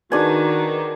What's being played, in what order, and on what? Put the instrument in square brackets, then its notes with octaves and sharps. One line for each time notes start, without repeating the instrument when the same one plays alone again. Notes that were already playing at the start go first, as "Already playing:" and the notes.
[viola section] D#3 [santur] D4 G#5 [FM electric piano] D#4 G#4 B4 [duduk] F#4